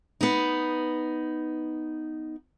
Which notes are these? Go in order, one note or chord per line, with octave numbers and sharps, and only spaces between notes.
B3 D#4